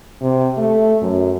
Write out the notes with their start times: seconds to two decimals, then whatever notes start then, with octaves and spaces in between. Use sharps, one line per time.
0.22 C3
0.58 A3
1.02 F#2